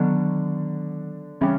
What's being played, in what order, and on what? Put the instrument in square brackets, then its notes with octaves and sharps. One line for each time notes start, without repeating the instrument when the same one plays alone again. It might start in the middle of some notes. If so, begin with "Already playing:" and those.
Already playing: [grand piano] D3 D4 [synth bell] D#3 F#3 B3
[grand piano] C#3 C#4 [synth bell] E3 G3